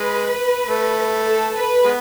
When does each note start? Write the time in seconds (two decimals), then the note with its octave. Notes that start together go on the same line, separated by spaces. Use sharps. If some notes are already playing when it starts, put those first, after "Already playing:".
Already playing: G#3 B4
0.69 A3
1.26 A4
1.56 B4
1.84 G#3 B3